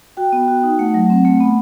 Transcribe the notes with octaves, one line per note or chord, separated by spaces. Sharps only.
F#4 G5
B3
F#4
D#4
A3 F#5
F#3
C4
A3
B3